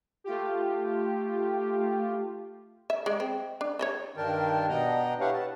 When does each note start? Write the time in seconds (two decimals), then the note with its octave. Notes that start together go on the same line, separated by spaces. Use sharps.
0.24 A3 F4 G4
2.90 E5
3.06 G#3 D5
3.20 C4
3.61 D4
3.79 C#5 D#5 E5
4.17 G2 D#3 D4 A#4 G5 A5
4.69 B2 B3 D4 D#5 G5 A#5
5.21 E4 G4 B4 C#5 F5 F#5
5.34 A5